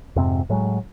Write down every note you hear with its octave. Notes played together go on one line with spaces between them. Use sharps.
F2 G#2 C3 C4
A2 F#3 G#3